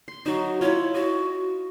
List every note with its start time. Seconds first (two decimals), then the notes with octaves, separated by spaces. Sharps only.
0.08 C6
0.26 F#3 D#4 F#4
0.61 E4 F4 C#5
0.94 F#4 D#5